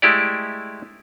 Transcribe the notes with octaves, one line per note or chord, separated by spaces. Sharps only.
G#3 A3 E4 G4 D5